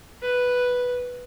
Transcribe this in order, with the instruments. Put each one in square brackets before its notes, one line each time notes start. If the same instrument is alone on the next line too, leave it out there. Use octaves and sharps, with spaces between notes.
[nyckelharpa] B4